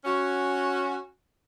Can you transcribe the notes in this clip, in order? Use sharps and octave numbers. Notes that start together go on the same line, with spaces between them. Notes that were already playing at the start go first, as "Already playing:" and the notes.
C#4 F#4